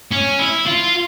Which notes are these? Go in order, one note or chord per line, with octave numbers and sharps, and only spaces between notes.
C#4
E4
F4